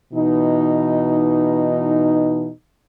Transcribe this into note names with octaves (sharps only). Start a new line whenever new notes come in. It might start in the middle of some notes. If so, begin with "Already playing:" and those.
B2 E3 D#4